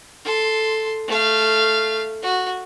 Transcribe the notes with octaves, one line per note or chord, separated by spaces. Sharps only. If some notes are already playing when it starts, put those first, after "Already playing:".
A4 C6
A3 F5
F#4